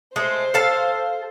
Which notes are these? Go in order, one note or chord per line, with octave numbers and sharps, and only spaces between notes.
G#3 A3 C5
A4 F5 A5